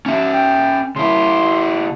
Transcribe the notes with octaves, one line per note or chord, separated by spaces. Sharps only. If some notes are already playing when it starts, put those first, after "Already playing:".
C#4 E5
G5
C#3 E4 C6